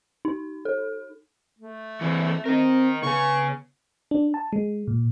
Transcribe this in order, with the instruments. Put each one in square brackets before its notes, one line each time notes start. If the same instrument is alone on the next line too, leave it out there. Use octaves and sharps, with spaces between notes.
[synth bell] D#4
A4
[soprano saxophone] A3
[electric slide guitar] E3 C4
[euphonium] C4 [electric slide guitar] D#4 A#4
[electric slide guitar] C#3 G#5 [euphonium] B3 [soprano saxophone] C#6
[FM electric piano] D4
A5
G#3
A#2